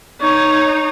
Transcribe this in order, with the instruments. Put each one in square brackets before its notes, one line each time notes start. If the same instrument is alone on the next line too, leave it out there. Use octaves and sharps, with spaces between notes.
[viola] D#4 [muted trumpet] C#5